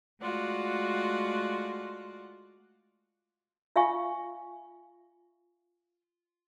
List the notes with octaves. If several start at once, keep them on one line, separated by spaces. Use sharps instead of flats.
G#3 A3 F4 F#4 D5 F#5
F4 E5 F5 G#5 C#6